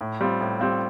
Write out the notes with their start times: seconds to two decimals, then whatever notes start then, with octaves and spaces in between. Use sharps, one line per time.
0.01 A2
0.21 G3 C4 F4
0.41 A2
0.60 G3 C4 F4